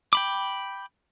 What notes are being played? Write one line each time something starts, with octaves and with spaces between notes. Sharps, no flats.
G5 B5 D6